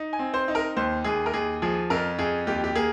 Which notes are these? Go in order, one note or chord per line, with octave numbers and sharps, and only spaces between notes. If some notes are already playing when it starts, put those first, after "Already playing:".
Already playing: D#4
G#5
C4
C5
D#4
A#4
D#2 C5
D#2 G#4
A#4
D#2 G#4
F3 G#4
F2 A#4
F2 G#4
D#2 G4
G4
A#3 G#4